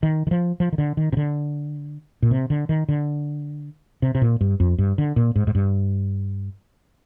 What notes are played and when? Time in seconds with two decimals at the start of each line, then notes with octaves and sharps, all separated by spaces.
0.03 D#3
0.27 D#3
0.31 F3
0.60 F3
0.73 D#3
0.78 D3
0.97 D#3
1.13 C3
1.17 D3
2.22 A#2
2.31 C3
2.50 D3
2.69 D#3
2.89 D3
4.02 C3
4.15 C3
4.22 A#2
4.41 G2
4.60 F2
4.78 G2
4.98 D3
5.16 A#2
5.36 G#2
5.47 G#2
5.55 G2